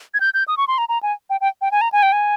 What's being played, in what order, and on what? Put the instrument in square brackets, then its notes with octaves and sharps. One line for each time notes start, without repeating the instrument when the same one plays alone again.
[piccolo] G#6
G6
G6
D#6
C#6
C6
A#5
A#5
G#5
G5
G5
G5
G#5
A#5
G#5
G5
G#5